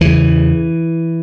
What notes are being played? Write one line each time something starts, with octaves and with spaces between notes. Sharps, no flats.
E2 C#3 E3